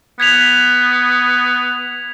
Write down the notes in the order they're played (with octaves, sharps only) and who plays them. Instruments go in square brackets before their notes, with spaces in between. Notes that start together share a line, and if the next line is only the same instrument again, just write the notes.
[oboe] B3 [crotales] G#6 B6 F7